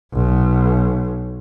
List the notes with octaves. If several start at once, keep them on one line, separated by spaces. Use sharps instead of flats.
B1